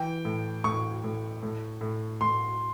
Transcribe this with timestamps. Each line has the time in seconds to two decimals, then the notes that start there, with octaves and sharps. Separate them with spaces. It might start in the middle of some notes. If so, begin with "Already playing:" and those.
Already playing: E3 G5
0.25 A2
0.64 A2 C#6
1.04 A2
1.43 A2
1.81 A2
2.21 A2 C6